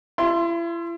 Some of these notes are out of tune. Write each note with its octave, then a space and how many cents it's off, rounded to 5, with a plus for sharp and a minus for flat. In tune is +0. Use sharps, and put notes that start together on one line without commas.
E4 +40 C6 +0